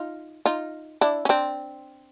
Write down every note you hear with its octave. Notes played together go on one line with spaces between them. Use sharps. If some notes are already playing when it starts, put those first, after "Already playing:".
Already playing: D#4 F4
D#4 F4
D4 E4
C#4
C4 D4